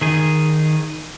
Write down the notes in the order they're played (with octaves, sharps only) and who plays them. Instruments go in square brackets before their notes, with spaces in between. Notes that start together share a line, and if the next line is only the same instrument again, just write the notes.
[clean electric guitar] D#3 G#4